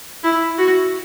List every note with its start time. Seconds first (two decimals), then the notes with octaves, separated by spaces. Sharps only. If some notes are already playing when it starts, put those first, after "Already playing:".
0.24 E4
0.58 F#4